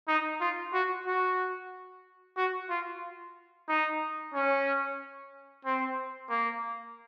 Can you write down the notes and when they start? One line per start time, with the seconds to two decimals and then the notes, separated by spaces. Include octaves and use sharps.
0.08 D#4
0.41 F4
0.74 F#4
1.06 F#4
2.37 F#4
2.70 F4
3.69 D#4
4.34 C#4
5.65 C4
6.30 A#3